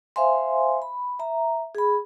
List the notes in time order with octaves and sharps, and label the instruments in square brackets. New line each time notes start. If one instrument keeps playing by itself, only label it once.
[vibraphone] C5 E5 F5 G#5 C6
B5
E5 A#5
G#4 B5